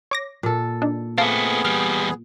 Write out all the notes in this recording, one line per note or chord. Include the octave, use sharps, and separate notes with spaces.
C#5 D6 A#6
A#2 A4
D4 D#4
A3 B3 C4 G#4 F5 A5 D6
E2 G3 F6